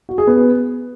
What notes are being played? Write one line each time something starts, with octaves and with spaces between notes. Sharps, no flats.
F#4
G#4
B3